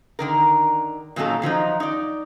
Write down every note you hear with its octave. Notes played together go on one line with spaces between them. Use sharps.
D3 D#3 A#4
A#2 D#3 F#3 C#4 D#4 A4
D#3 F3 F#3 D#4
D#4 D5